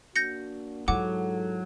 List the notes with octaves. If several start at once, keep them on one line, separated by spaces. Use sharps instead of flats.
A#3 D4 F#4 G6 A#6 C#7
G#2 F#3 E4 F4 A4 F#5 D6